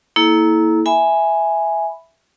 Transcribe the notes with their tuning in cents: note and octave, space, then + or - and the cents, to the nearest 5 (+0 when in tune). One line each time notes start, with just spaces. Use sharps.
A#3 +0 E4 -20 A4 -35
E5 +0 G#5 +0 B5 +0